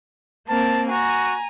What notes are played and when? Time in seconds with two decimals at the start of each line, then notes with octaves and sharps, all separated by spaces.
0.49 A#3 C4 A#4 A5
0.88 F#4 G#5 A#5